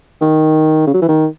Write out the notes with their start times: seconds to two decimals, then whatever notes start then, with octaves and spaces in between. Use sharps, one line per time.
0.21 D#3
0.87 C#3
0.94 F#3
1.02 E3
1.09 D#3